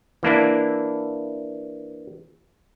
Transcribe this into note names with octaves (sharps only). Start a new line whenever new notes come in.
E3 A#3 D4 E4